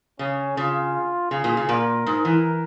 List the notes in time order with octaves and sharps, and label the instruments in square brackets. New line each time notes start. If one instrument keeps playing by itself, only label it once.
[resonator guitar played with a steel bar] C#3 [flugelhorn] C#4
[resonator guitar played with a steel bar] C#3 [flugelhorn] F4
[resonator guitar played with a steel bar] C#3 [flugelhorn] G#4
[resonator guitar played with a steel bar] A#2
C#3
[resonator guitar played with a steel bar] A#2 [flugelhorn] A#4
[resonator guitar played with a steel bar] G#2
E3